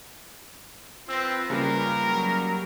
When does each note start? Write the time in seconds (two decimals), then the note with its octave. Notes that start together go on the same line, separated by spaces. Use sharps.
1.09 C4 F4 B4 E6 A#6
1.50 C#3 G3 A#3 G4 A#4
2.08 F#3